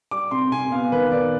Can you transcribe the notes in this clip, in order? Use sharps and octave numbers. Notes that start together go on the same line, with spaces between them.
G3 D6
C3 C6
C3 G#5
B3 F5
D#3 B4
D#3 D5